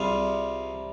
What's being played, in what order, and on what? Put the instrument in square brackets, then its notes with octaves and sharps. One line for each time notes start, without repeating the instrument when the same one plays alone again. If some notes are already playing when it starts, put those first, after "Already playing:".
Already playing: [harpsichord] C2 C3 G3 F4 G#4